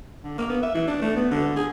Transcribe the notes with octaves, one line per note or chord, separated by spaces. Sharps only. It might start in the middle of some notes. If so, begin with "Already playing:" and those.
D3
A#3
B3
E5
E3
D4
A3
B3
D3
G#4